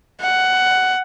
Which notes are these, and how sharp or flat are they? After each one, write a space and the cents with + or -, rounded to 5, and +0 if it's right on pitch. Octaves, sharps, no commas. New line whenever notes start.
F#5 +10